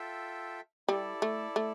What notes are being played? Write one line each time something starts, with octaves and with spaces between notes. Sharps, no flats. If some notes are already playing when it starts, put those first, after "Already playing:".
Already playing: F4 A4 E5 G5
G3 E4 A4 D5
A3
A3